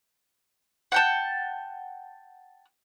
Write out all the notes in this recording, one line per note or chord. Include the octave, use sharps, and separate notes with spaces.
F#5 G5 A5